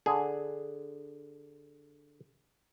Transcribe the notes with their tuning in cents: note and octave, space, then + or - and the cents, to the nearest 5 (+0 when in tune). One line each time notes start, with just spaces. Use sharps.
D3 +0 G#4 +0